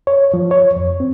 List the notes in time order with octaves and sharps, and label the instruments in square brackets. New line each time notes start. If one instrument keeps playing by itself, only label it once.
[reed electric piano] C#5
F3
C#5
F2
C4